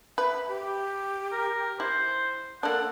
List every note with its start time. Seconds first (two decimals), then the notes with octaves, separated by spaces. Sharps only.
0.18 B4 E5
0.48 G4
1.32 A#4
1.80 E4 C5
2.63 A#3 D4 A4 F#5